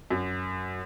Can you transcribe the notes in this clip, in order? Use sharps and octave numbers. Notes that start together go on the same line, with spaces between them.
F#2